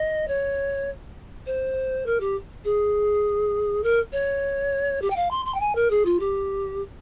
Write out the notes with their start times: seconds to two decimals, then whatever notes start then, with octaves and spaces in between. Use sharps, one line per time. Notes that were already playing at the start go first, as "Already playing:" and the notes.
Already playing: D#5
0.28 C#5
1.46 C5
2.06 A#4
2.20 G4
2.64 G#4
3.83 A#4
4.12 C#5
5.01 G4
5.10 G5
5.16 F5
5.30 C6
5.45 C6
5.54 G5
5.60 G#5
5.75 A#4
5.90 G#4
6.05 F4
6.19 G4